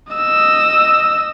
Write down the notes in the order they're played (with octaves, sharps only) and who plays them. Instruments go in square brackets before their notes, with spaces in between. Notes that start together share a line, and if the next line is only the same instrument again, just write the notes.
[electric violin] D#5 E6